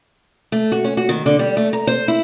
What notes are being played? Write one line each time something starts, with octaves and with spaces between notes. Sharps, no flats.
A3
F#4
C#4
F#4
D#3
D3
G3
A3
A#5
C5
E4